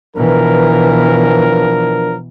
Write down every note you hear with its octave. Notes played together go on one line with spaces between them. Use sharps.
B2 E3 F3 D4 A#4